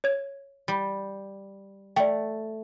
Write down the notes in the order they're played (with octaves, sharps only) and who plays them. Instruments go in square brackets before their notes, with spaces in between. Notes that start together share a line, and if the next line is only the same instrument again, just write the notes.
[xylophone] C#5 G#6
[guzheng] G3
[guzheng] A3 [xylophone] D5 G5